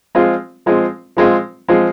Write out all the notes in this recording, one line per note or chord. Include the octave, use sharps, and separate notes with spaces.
F3 G#3 C4 F4
F3 G#3 C4 F4
F3 G#3 C4 F4
F3 G#3 C4 F4